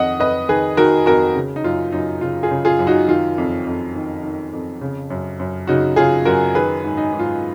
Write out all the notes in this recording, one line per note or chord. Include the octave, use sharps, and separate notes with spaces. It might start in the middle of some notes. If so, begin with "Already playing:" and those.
Already playing: F2 D#3 D#5 F#5
F2 B4 D#5
D#3 G#4 B4
D#3 F#4 A#4
F2 F#4 A#4
C#3
D#4
F#2 F4
F#2 D#4
C#3 F4
F4 G#4
C#3
F4 G#4
F#2
D#4 F#4
D#3 F4
F2
F2
D#3
D#3
F2
C#3
F#2
F#2
C#3 D#4 F#4
C#3 F4 G#4
F#2 F#4 A#4
D#3 G#4 B4
G#2
D#4
G#2
F4